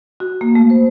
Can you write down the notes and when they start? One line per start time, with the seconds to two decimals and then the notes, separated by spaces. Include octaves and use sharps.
0.20 F#4
0.41 A#3
0.55 A3
0.70 C5